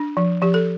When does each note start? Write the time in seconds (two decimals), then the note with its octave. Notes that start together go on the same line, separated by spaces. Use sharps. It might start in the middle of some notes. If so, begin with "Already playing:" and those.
Already playing: D4
0.17 F3
0.42 F3 G4
0.54 A4